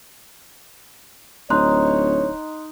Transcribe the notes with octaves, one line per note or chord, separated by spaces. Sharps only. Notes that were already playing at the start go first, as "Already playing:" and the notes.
D1 D#4 C#5 C6 F#6